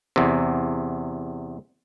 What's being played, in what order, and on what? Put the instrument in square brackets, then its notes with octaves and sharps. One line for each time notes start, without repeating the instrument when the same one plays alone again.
[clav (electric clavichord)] E2 C3